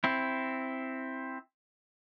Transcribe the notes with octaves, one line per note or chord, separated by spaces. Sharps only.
C4 E4